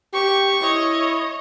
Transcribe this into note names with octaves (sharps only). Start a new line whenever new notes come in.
G4 C#6
E4 C#5 D#5